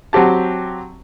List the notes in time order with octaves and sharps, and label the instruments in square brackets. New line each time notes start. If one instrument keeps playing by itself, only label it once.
[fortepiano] F#3 C4 G4 A5